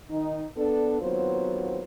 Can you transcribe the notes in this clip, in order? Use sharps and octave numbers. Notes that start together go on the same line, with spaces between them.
D#3 D#4
B3 D4 A4
D#2 F#3 B3 C4 F4 C5